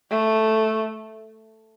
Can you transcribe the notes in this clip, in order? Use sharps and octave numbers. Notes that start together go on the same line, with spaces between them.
A3